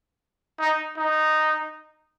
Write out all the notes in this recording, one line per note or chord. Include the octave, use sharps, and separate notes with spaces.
D#4
D#4